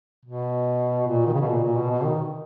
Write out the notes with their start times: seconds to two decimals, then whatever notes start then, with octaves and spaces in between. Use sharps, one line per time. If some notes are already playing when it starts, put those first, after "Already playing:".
0.25 B2
1.07 A#2
1.26 D#3
1.34 C#3
1.41 B2
1.49 A#2
1.63 A#2
1.76 B2
1.90 B2
2.04 D#3